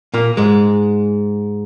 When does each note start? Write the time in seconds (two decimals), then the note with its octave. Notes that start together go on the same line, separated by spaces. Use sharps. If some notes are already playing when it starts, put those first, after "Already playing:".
0.14 A#2 A#3
0.37 G#2 G#3